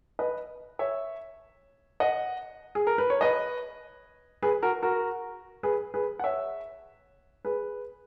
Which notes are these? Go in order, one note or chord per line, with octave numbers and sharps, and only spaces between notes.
B4 D#5
C#5 E5
D#5 F#5
G#4
A#4
B4
C#5
B4 D#5
G#4 B4
F#4 A#4
F#4 A#4
G#4 B4
G#4 B4
F#5
C#5 E5
G#4 B4